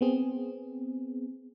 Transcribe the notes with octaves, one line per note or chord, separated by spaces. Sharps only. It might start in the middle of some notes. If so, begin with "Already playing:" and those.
B3 C4 G#4